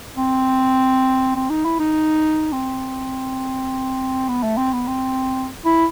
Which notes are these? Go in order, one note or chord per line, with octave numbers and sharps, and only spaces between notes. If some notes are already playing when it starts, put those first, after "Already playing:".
C4
C4
D#4
E4
D#4
C4
B3
A3
C4
B3
C4
E4